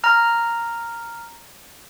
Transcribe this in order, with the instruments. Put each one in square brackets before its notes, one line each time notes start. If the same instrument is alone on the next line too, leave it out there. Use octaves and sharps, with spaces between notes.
[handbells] A#5 F6